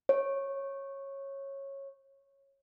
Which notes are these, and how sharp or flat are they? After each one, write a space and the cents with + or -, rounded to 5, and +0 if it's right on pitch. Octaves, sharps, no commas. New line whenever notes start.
C#5 -15